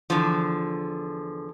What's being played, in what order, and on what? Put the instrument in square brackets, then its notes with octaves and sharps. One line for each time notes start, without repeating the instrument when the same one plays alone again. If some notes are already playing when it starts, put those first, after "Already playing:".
[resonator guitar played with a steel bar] E2 D3 F3